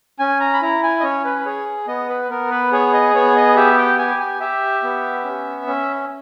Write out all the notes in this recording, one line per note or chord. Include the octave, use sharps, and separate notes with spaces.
C#4 G#5
A#5
B5
E4 A#5
G#5
D#5
C#4 C#5
B4
B4
G#4 C#5
B3 D#5
B4
B3 A#4
B4
G#4 C#5
D#5
B3 C#5
D#5
G4 E5
G5
G4 G#5
G#5
G4 E5
B3
C#4
C#4